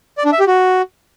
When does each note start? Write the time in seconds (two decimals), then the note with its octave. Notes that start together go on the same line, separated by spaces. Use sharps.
0.18 D5
0.25 D4
0.32 E5
0.40 G4
0.47 F#4